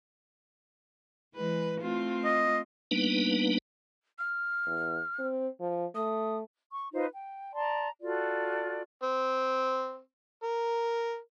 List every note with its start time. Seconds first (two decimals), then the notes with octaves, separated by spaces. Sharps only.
1.35 E3 G#3 B4
1.81 A3 C4 F4
2.24 D#5
2.91 G3 A#3 B3 D4 D#4 B4
4.19 F6
4.67 E2
5.19 C4
5.60 F3
5.95 A3 D#6
6.72 C#6
6.93 D#4 F4 B4 C5
7.14 G5
7.53 D5 A5 A#5 C6
8.01 F4 F#4 A4 D5
9.03 C4
10.43 A#4